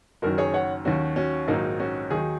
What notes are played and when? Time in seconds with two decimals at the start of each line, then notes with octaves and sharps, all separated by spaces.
0.22 F#1 F#2 D#3 F#4 A#4
0.38 G#4 C#5
0.54 C#5 F#5
0.85 D#2 D#3 F#3 C#4 F#4
1.16 C#4 F#4
1.48 A#1 G#2 D#3 F#3 A#3 D#4
1.80 C#4 F#4
2.10 D#2 D#3 F#3 D#4 G#4